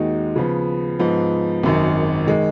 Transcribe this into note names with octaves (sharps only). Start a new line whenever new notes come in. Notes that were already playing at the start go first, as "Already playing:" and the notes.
Already playing: D#2 D#3 G#3 D#4 F#4
C#3 F3 B3
G#2 F3 B3
G#1 F#2 D#3
D#3 G#3